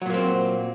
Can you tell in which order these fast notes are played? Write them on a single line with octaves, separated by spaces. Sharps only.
F#3 A#2 A#3 C4